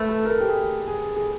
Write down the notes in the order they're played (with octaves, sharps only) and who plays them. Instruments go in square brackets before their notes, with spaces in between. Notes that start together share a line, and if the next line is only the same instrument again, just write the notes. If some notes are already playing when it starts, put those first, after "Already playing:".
Already playing: [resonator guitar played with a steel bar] A3 [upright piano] B4
[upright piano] A4
A#4
A4
G4
G#4
G#4
G#4